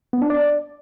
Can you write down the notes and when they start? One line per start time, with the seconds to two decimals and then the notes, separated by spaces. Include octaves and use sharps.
0.13 B3
0.22 D4
0.30 D5